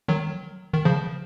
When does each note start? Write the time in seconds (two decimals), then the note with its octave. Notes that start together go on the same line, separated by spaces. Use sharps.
0.08 D#3 F#3
0.73 D#3
0.85 C#3 F3